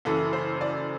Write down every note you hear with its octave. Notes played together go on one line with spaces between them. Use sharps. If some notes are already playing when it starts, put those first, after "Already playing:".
F#1 F#2 E3 A4
C5
D5